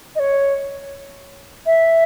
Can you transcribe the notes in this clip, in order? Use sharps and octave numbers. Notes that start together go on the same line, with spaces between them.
D#5
C#5
E5